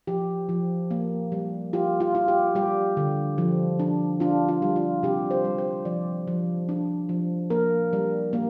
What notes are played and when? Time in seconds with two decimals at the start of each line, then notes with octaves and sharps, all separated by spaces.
0.07 F3 G4
0.49 F3
0.91 A#3
1.32 G3
1.73 F4 G4
2.00 F4
2.15 F4
2.28 G4
2.55 G3 G4
2.97 D3
3.38 F3
3.79 D4
4.20 D4 F4
4.48 F4
4.62 G3
4.76 F4
5.03 C3 G4
5.31 C5
5.45 G3
5.58 C5
5.85 F3 D5
6.27 F3
6.69 D4
7.09 F3
7.50 A#3 A#4
7.93 G3
8.33 A#3